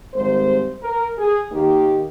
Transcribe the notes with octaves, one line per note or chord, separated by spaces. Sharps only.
G#1 G#2 G3 C5
A#4
G#4
D#2 D#3 A#3 G4